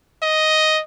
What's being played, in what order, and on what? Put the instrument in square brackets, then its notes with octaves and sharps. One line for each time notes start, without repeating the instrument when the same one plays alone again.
[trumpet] D#5